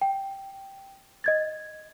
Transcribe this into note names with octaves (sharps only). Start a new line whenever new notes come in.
G5
D#5 G#6 A6